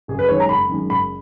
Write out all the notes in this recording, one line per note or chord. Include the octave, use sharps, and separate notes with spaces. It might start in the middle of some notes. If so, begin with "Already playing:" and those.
F#1 G#4
B4
F#2 D#3 G#3 C#5
A#5
F#1 B5
F#2 D#3 G#3
F#1 B5